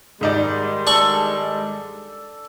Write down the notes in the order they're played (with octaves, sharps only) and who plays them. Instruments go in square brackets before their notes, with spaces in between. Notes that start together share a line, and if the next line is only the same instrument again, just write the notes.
[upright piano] G#2 D#4 D5 [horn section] D#3 G3 G#3
[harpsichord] D4 C#6 [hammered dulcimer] A4